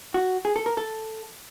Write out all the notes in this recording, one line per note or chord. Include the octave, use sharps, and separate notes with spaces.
F#4
G#4
A4
A#4
A4